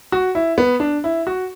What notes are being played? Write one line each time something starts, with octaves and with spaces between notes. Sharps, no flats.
F#4
E4
B3
D4
E4
F#4